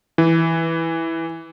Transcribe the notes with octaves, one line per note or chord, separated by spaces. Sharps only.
E3